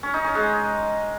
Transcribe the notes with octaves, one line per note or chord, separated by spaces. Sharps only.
C#4
D#4
C#4
G#3